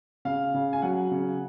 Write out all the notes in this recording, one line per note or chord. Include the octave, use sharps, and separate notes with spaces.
C#3 F5
C#3
G#5
F#3 F#5
C#3